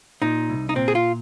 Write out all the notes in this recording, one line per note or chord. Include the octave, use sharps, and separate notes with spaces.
A#2 D#4
C2
D#4
A#2 C4
G#4
F4